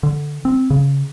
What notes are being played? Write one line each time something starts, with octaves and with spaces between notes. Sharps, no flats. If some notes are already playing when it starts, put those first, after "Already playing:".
D3
C4
C#3